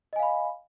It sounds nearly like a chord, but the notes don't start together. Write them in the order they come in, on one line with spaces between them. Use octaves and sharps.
D#5 G#5 F5 B5